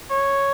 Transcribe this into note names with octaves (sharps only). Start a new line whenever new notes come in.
C#5